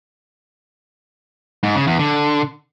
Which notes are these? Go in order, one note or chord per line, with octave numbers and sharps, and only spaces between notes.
G#2
C#3
E2
D3